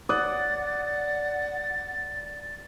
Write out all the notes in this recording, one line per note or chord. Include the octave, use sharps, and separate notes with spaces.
D5 F#5 D#6 F#6 A6